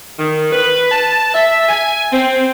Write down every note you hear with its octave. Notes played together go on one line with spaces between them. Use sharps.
D#3
B4
A5
E5
G#5
C4